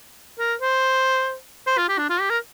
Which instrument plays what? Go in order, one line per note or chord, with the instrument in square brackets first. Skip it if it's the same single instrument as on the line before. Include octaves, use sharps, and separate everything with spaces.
[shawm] A#4
C5
C5
F4
G4
D4
F4
G4
A#4